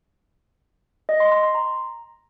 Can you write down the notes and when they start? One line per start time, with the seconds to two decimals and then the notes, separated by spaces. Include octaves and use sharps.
1.09 D#5
1.20 C6
1.32 C6
1.43 C6
1.55 A#5